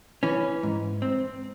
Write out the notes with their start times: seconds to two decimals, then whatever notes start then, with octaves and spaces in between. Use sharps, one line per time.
0.23 E3 C#4
0.63 G#2
1.02 C4